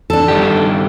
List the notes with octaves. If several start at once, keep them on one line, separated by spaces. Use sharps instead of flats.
D4 A4
G2 D#3 G4